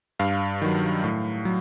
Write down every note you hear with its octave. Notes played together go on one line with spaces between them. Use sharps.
G2 F5
D#3 F#3
A2
F#3